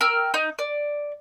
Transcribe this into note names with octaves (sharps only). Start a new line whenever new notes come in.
A#4 G5 E6 F6
D#4
D5